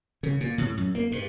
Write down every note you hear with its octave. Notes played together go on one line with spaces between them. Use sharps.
C#3
A#2
A2
F#2
A#3
G2